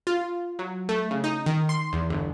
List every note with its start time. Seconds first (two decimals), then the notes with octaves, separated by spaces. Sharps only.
0.07 F4
0.59 F#3
0.89 A3
1.11 C#3
1.24 D#4
1.46 D#3
1.69 C6
1.93 E2
2.10 G1